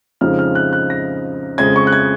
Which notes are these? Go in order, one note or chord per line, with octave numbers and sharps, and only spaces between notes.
F2 C#3 F3 G#3 D#4 F6
F6
F#6
F#6
A#6
F2 C#3 G#3 G#6
C#6
F#6
G#6